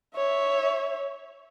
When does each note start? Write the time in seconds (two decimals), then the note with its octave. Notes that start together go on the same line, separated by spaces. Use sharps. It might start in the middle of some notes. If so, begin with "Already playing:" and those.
0.16 C#5 E5